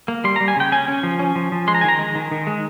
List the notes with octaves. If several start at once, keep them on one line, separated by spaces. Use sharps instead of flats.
A#3
G3 C6
G3 A#5
G#5
C#3 G5
C#4 G#5
C#4
F3
C#4
F3
F3
G#3 C6
A#5
D#3 G#5
A#5
G#3
D#3
D#3
G#3